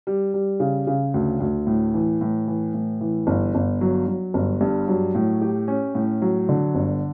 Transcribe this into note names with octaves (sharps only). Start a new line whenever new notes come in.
G3
G3
C#3
C#3
D2
D2
A2
E3
A2
E3
A2
E3
G1
G1
F#3
F#3
G1
G2
F#3
A2
G4
C#4
A2
F#3
D3
G1